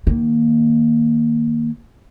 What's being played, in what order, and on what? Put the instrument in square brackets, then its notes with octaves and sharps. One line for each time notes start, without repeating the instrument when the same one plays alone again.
[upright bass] D#3 A#3